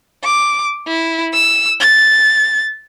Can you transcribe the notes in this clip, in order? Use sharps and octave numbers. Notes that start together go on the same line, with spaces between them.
D6
E4
E6
A6